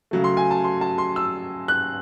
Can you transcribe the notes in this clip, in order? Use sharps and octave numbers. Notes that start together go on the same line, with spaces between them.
C#3 F#3 A3
C6
G#5
A5
C6
A5
C6
E6
F#6